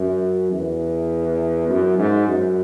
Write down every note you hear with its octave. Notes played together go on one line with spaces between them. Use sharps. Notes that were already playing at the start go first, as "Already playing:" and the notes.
Already playing: F#2
E2
F#2
G#2
F#2